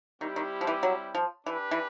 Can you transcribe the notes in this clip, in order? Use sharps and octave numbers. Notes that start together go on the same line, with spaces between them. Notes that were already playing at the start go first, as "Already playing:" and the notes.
D#3 G3 C4 E4 G4
D#3
F3
E3
F#3
F3
E3 D4 G4 B4
E3